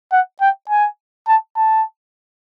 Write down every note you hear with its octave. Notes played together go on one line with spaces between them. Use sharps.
F#5
G5
G#5
A5
A5